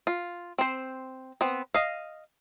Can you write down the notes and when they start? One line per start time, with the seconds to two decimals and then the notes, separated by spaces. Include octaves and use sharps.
0.07 F4
0.58 C4 C5
1.41 B3 C4
1.74 D#5 F5